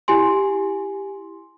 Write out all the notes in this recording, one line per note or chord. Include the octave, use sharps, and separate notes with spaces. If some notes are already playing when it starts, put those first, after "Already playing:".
E4 G4 G#5 C6